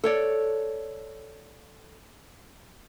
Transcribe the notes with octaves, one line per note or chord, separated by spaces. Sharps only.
A4 C#5 D5